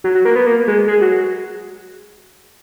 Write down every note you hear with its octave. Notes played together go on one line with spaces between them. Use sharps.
F#3
F#3
A#3
B3
A#3
G#3
G#3
F#3